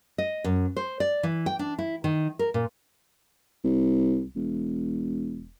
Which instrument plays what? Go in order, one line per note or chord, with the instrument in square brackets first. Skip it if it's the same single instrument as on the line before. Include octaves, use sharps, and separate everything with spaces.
[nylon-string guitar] D#5
F#2
C5
D5
E3
G5
D4
E4
D#3
A#4
A#2
[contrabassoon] C2
E1